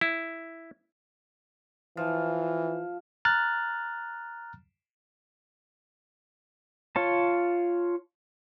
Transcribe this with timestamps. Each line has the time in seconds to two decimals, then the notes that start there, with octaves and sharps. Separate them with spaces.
0.01 E4
1.97 E3 F3
3.25 A#5 F6 F#6 A6
6.96 F4 C#5 A5